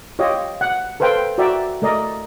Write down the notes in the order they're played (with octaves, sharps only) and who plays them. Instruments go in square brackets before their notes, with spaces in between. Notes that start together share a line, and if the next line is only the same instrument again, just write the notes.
[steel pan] F4 G4 C#5 D#5
F#5
A4 B4 C5 F5 G5
F#4 A#4 D5 E5 G5
A3 A#4 D5 D#5